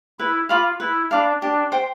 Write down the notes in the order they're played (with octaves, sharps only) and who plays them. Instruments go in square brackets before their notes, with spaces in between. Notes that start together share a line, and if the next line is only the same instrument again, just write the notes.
[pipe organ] E4 [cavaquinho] B4
[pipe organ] F4 [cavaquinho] F5 B5 D6
[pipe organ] E4 [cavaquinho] B4
[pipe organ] D4 [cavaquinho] F5 B5 D6
[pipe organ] D4 [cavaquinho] G4
[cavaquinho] C5 G5